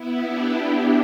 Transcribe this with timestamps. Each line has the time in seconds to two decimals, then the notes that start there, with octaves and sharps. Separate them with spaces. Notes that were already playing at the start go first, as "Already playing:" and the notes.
Already playing: B3 E4
0.24 D4 G4
0.57 D4 G4